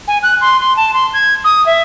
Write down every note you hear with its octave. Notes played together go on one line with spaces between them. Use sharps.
G#5
F#6
C6
C6
A5
C6
G#6
D#6
E5